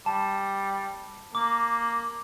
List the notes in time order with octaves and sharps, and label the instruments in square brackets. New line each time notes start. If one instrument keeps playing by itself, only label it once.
[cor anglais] G3 [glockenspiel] A5
[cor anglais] A#3 [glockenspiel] D6